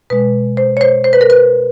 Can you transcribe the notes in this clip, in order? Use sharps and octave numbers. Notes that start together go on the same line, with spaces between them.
B2 G#3 B4
C5
C#5
C5
C5
B4
A#4
B4